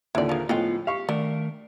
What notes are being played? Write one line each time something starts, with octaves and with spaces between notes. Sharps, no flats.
D#2 A#2 D3 E4 D5
F3 G#4 A#4
A2 F3 G#3 B3 C#4 F4 G5
G4 F5 C#6
D3 D#3 A3 A#4